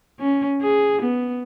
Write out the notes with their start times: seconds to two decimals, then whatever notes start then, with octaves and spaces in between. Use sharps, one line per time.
0.20 C#4
0.62 G#4
1.02 B3